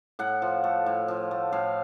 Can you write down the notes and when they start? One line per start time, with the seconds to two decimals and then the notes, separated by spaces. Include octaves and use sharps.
0.19 A2 F#5
0.42 F3
0.64 A3
0.86 A2
1.08 F3
1.31 A3
1.52 A2 F5